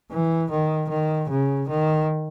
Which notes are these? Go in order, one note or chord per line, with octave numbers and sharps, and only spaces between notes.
E3
D#3
D#3
C#3
D#3